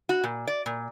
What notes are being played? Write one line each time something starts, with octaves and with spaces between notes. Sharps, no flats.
F#4
A#2
D5
A#2